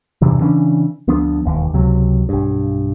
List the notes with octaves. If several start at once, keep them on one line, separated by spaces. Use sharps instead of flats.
E2 G2 C3 E3
C#3 E3 C#4 D4
D2 F3 B3 D4
E1 D#2
C#2 C3 F#3
B1 G2